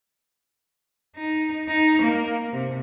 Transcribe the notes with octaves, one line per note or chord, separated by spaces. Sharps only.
D#4
D#4
A#3
C3